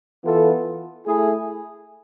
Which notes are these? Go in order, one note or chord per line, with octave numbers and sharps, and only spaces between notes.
E3 B3 F4 A4
A3 E4 G#4